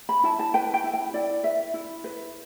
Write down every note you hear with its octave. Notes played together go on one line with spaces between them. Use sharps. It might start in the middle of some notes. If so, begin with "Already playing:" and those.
B5
E4 A5
A5
B4 G5
G5
E4
G5
E4 D5
B4 E5
E4
B4